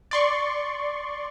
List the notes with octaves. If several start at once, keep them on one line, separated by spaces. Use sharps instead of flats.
D5 C6 C#6